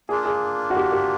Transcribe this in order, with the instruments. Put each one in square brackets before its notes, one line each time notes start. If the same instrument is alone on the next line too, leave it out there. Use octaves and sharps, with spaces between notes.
[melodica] A#3 D4 F4 [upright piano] G#4
[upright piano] G#4
F#4
G4
G4